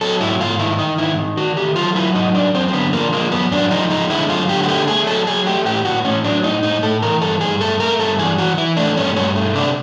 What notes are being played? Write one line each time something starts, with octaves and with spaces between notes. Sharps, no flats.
F#3 A4
G#2 E4
G#2 F4
D#3 E4
D#3 D#4
G#2 E4
D#3
D#3 F#4
A3 G4
F#3 F4
F#3 E4
G#2 D#4
F#2 D4
F#2 C4
C4
D3 B3
F3 A#3
G#3 A#3
F#2 B3
F#2 D4
F3 D#4
G#3 D#4
D3 E4
F#2 F4
D3 G4
F#4
A3 G4
A3 G#4
F#3 A4
F#3 G#4
A3 G4
A2 G4
A2 F#4
A2 C#4
F#3 D4
A2 D#4
A2 D#4
A2 A4
E3 A#4
G2 A4
G2 G#4
A3 A4
A3 A#4
G2 A4
E3 G#4
E3 F#4
E3 E4
A3 D4
G2 C#4
G2 C#4
A3
C3 D4